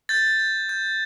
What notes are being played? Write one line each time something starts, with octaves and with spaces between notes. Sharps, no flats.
G6 A6
G6
G6